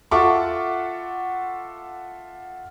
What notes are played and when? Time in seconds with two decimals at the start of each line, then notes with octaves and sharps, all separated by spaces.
0.11 F4 A4 E5 F#5 C#6 D6